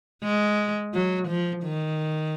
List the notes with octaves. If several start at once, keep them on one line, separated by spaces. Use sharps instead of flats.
G#3
F#3
F3
D#3